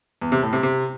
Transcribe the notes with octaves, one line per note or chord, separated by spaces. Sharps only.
E2
C3
A2
C3
C3